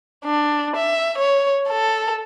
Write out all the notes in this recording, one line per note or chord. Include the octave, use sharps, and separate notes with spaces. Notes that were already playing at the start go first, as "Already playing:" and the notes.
D4
E5
C#5
A4